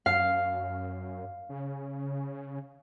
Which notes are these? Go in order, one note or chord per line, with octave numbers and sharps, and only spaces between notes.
F#2 F5
C#3